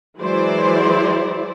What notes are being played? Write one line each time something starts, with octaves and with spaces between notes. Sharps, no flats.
E3 F#3 G#3 E4 C5 D5